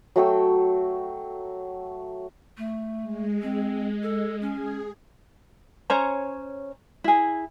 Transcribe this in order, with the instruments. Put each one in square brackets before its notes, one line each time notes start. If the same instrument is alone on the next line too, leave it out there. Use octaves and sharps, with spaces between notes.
[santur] F#3 A3 G5 E6
[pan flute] A3
[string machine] G#3
[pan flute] C4
A4
[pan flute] C#4 [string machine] G#4
[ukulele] C#4 C5 C#5 A#5
E4 G#4